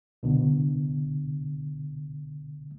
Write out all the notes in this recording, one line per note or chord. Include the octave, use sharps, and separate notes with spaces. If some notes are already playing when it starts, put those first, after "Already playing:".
C2 B2 D3